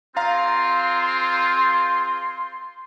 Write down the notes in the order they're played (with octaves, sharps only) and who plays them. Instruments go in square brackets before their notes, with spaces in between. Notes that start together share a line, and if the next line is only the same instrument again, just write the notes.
[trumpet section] C4 F4 G#4 [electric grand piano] F5 A#5 [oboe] C6